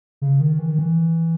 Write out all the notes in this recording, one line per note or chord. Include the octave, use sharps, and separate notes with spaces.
C#3
D#3
E3
D#3
E3